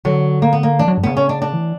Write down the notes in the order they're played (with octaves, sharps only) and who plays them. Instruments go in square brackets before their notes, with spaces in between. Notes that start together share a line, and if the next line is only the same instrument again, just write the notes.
[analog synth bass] D3 [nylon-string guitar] F#3
[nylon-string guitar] A#3
B3
A#3
[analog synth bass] E3 [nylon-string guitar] D4
[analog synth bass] F#3
G2
[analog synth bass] C#3 [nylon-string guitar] B3
[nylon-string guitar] C#4
D4
D4
[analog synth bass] E3